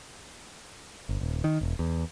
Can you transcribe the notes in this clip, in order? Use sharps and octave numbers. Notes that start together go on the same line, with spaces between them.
G1
D#1
D#3
E1
E2